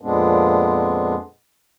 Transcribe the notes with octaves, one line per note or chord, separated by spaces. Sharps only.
F2 A#2 G#3 B3 C4 D4